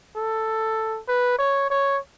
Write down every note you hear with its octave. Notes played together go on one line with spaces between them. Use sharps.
A4
B4
C#5
C#5